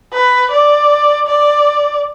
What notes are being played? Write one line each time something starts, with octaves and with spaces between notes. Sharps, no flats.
B4
D5
D5